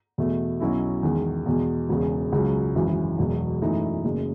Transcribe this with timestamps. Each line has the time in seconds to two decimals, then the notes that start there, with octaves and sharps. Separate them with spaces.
0.18 E2 B2 A3
0.60 B1 B2 F#3 C#4 E4
1.03 E2 D#3 G#3
1.46 E2 B2 G#3
1.89 E1 E2 C#3
2.32 C#2 C#3 F#3
2.75 G#1 F#2 E3
3.18 E1 E2 B2 F#3
3.61 F#2 E3 A3 D#4
4.04 F#1 F#2 C#3 G#3